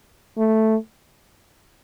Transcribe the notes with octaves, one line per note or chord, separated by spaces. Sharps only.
A3